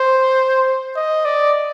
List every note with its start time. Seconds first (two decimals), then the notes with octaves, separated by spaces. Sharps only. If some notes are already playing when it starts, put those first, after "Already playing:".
Already playing: C5
0.96 D#5
1.25 D5